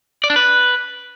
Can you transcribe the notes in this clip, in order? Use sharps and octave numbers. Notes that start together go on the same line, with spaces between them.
D5
D4
B4